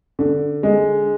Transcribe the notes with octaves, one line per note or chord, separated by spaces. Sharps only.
D3
G#3